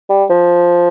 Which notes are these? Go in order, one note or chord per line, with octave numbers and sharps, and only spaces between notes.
G3
F3